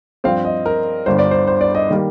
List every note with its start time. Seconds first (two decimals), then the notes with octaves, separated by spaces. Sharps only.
0.24 G2 F3 C4 F5
0.45 D#5
0.66 A#4
1.06 G1 G2 D3 C5
1.19 D5
1.31 C5
1.47 C5
1.61 D5
1.75 D#5
1.90 D#3 G3 A#3